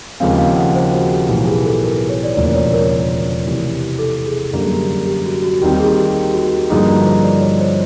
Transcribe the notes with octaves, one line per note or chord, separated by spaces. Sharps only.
D#2 C#3 F3 G#3 C4 F5
F5
F#5
C5
F#4
G4
B1 A2 E3 G4
G#4
A4
A#4
B4
C#5
D5
E1 D2 C#3 F3 A#3 D5
C#5
A#4
C3 E3 A3
A4
G#4
F#2 D3 G3 A#3 G4
G#4
G4
G4
F#4
F#4
D#2 D#3 G3 C4 G4
G#4
G4
G4
F#4
G2 D3 F3 A#3 D#4 G#4
F#4
C5
D5
C#5
C5